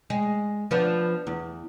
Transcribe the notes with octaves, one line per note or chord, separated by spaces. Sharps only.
G#3
F3 B3 D4
E2